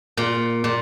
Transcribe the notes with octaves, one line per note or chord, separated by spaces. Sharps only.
A#2
A#2